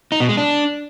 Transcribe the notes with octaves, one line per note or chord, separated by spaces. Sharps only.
D#4
B2
G#3
D4